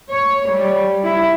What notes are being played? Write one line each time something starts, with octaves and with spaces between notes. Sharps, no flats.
C#5
G3
E4